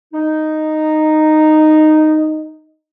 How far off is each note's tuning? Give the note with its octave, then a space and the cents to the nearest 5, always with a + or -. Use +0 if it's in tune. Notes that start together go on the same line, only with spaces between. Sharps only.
D#4 -5